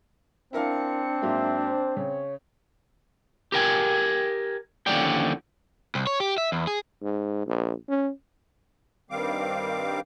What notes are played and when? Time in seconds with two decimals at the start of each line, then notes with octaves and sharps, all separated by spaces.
0.53 C4 D4 E4 A#4 F5 C#7
1.22 G#2 F#3 A#3 E5
1.63 C5
1.97 C#3 C#5
3.52 G4 A#4 G5 G#5
4.86 D#2 D3 F3 C#4 D5 G5
5.95 C2
6.07 C#5
6.20 G4
6.38 E5
6.52 E2
6.67 G#4
7.02 G#2
7.46 A#1
7.88 C#4
9.10 G2 D#3 G3 C4 F5 D6